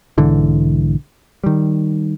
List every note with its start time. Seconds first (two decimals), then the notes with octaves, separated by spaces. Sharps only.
0.18 B1 G#2 D3 E3
1.44 D#3 G3